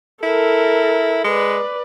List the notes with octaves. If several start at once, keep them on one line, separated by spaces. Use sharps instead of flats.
E4 A4 A#4
G#3 B4 D5